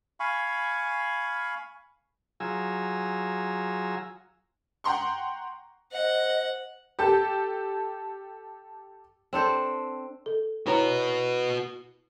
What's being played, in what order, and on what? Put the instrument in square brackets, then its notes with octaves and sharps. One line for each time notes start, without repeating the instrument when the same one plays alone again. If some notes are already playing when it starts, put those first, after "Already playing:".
[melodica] F5 G#5 B5 C#6
[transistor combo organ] F#3 F4 G#4 G#5 A#5 E6
[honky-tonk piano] F#5 G5 A#5 C6 C#6
[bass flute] C5 [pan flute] D#5 [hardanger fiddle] F#5
[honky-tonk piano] G4 A4 A5
[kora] C4 D4 A4 C5
[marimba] A4
[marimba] E4 C#5 A#5 [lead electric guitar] F#4 B4